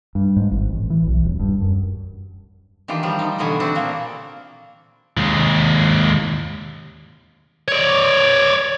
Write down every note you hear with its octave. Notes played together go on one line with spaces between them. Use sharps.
G2
G#2
G#1
A1
E3
B1
D#1
G2
F#2
D#3 E3 D4 F4 G4
F3 G3
D#4
B2 D3 E3 B3 F#4 G#5
C4 D4 F#4
A#2 A#3
D#2 G#3
C#5 D5